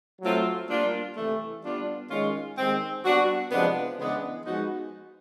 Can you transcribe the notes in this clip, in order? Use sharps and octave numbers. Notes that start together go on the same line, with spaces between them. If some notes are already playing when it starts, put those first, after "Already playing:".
F#3 A3 C4 F4
G3 A#3 D4 F4
C3 E3 A3
G3 B3 D4 F4
D#3 G#3 C#4 F4
D#3 G#3 C4
G3 B3 D4 F#4
C3 F3 G#3 B3 D4
C#3 E3 G#3 B3 D4
F3 G#3 B3 D#4 F#4